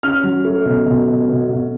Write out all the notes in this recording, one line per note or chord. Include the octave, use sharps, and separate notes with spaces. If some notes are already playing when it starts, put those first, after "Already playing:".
C#4 F6
F#3
A3
B2
B2
B2
B2
B2